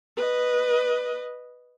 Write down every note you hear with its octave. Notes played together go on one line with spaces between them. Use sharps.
B4 D#5